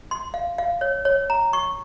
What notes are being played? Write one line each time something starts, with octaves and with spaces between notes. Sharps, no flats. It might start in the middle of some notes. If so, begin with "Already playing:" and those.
C6
F5
F5
C#5
C#5
A#5
C#6